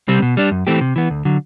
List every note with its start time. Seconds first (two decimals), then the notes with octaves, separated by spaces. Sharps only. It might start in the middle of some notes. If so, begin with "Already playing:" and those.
0.08 C3 G3 C4
0.22 B2
0.37 G3 D4
0.51 F#2
0.67 E3 A3 C4 G4
0.81 C3
0.96 E3 B3
1.10 D2
1.25 D3 F#3